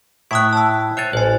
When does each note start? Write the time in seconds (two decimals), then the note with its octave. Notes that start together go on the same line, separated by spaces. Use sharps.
0.31 A2 E4 C#6 D#6 F#6
0.53 A5 E6
0.97 C5 C#5 G#5 F#6 A6
1.13 A1 C5 G#5